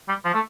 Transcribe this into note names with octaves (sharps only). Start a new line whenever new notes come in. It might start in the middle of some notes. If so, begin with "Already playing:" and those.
G3
F3
A3